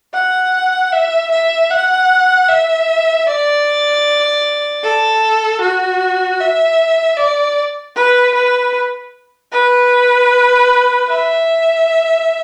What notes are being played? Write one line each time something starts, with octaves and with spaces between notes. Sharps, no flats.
F#5
E5
E5
F#5
E5
D5
A4
F#4
E5
D5
B4
B4
B4
E5